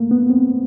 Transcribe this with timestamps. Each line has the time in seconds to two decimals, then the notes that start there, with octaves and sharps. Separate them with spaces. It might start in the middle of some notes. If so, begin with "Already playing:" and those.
Already playing: A3 A#3
0.11 B3
0.29 C4